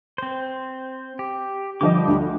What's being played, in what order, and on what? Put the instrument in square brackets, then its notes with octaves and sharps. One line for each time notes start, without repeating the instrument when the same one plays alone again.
[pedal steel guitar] C4 C5
G4
[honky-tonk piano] D3 F3 D#5 [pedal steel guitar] G3 G4 D6
[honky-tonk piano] D2